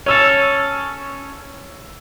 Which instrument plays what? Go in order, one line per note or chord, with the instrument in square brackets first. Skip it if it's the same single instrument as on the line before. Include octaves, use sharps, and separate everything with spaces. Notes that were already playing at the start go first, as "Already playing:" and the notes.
[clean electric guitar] C#4 A4 [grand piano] C#5 E6